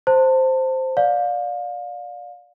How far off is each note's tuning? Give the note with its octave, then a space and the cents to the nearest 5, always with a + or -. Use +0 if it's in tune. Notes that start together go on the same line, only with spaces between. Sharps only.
C5 +0 A5 +30
D5 +0 F5 +30